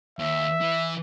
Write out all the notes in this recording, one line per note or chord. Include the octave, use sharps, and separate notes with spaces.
D#2 E5
E3